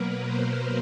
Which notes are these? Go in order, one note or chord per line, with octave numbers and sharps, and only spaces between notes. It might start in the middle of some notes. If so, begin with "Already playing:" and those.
Already playing: B2 F#3 A#3 A#4 B4
A#4 C5